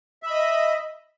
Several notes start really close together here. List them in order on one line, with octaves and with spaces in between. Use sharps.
E5 B5 D#5